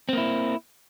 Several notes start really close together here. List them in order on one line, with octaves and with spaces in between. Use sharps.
C4 A#3 E4